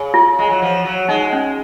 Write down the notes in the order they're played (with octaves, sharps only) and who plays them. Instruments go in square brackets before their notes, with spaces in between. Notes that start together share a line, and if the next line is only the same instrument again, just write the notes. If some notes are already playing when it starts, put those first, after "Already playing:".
Already playing: [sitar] C#3
[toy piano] F4
[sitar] G#3
F#3
F3
F#3
[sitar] G#3 [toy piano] D#4
[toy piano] C#4